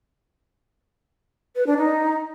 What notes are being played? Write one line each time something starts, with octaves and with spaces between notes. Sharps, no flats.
B4
D4
D#4